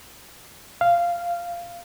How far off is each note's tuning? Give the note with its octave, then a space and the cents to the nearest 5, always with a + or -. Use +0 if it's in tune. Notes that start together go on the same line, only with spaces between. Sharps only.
F5 -10